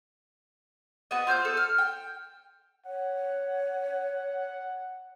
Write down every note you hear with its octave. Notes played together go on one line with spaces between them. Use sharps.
B3 F#4 D#5
F4 C5 F6 G6
A4
F6
G5
C#5 F#5